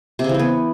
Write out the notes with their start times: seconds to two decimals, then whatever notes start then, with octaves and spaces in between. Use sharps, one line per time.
0.19 C3
0.24 C#3
0.29 E3
0.34 C4
0.39 B3